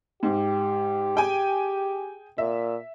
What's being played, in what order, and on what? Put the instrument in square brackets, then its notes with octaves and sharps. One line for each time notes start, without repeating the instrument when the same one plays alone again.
[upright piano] G#2 [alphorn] G4
[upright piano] G#4 G5 G#5
[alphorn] A#2 [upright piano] E5